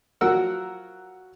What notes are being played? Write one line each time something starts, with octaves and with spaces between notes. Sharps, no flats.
F3 F#3 F#4 A#4 F#5 E6